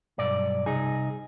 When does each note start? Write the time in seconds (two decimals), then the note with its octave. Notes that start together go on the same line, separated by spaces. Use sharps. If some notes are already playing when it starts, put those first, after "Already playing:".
0.18 B1 G2 D5
0.66 C2 D#4 G#4